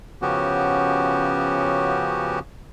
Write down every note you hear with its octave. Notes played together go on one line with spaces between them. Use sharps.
C#3 F3 B3 C#4 F#4 G4